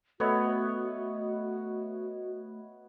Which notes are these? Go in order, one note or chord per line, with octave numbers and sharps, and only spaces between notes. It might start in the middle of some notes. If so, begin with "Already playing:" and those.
A3 B3 F#4 C#5 D#5 E5